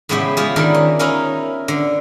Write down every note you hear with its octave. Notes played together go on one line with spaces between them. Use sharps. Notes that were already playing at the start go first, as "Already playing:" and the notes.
A2 C#3 G#3 B3 E4 G4
G#3 F4 G4 G#4
D3 D#3 D4 E4 A#4
C#4
C#4 D#4 E4 A#4 F5
D3